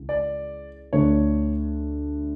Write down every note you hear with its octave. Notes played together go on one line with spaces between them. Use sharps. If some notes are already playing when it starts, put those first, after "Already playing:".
Already playing: C#2 C#3 E3
D5
D2 D3 A3 D4 C#5